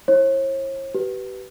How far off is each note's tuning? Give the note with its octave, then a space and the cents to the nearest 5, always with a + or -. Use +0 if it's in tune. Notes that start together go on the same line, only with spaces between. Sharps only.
E4 +0 C#5 -45
G4 -35 B4 +0